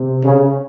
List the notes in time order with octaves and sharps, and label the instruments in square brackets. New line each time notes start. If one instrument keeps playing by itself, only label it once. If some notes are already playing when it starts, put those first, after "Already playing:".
Already playing: [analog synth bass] C3
[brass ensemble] C#3